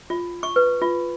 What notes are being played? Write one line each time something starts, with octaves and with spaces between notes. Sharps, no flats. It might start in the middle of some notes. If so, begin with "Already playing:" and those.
F4
C#6
B4
F4